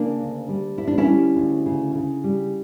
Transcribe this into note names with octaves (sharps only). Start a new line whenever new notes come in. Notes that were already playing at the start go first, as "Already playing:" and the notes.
Already playing: C#3 A#3 D4
D2
G3
D2 E4
D4
C#4 E4
G3
D2
C#3
C#3
G3